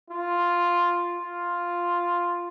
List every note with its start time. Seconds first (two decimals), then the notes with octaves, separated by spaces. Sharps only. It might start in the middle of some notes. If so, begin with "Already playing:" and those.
0.10 F4
1.18 F4